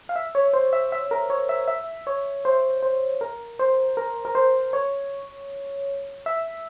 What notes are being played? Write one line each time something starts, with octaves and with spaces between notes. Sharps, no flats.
F5
E5
C#5
C5
E5
E5
A#4
C#5
E5
E5
C#5
C5
C5
A#4
C5
A#4
A#4
C5
C#5
E5